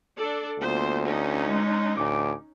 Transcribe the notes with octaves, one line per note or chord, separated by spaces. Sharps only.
D4 A4 D5
D2 A#3 B3 F4 C5
C#4 D#4
G#3
D2 A2 G#5 D6